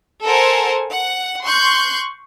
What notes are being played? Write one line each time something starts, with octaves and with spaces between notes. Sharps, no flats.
A4 A#4 C5 F#5 G#5
F#5
C6 C#6 F#6 G6